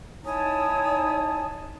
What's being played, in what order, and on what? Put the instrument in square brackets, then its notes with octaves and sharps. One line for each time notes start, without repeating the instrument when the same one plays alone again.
[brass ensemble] D#4 [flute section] E4 G#5 D#6 [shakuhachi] C#5 [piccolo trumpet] A5